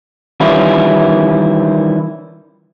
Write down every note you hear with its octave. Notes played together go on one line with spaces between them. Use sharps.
D#3 E3 G3 C#4 E4 F4